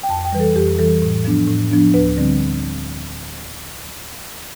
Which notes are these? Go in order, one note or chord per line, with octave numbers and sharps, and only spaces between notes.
G5
F2 A5
G5
E3 G3 B4
A4
F2 G4
E3 G3 A4
A2
F3 B3 D4
A2
F3 B3 D4
D2 B4
D3 G3 C4